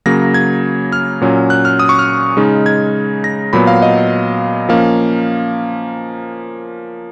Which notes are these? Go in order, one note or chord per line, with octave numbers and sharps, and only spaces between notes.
C#3 F#3 A#3 A#6
G#6
F6
A#2 F#3 C#4
F#6
F6
D#6
C#6
F6
C#3 G#3 D#4
G#6
A#6
A#2 F#3 B3 B5
F5
D#5
F3 A#3 C#4 F5